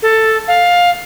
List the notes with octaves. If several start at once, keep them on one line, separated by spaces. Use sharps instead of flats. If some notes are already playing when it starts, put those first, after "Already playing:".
A4
F5